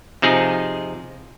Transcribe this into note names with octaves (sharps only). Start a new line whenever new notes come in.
C3 F3 D#4 G#4